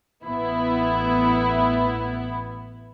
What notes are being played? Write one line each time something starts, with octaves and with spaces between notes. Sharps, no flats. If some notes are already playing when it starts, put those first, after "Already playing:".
A1 B3 E4